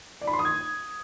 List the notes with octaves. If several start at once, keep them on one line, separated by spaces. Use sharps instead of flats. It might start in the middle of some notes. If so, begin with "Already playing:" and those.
D5
B5
C6
D#6
G#6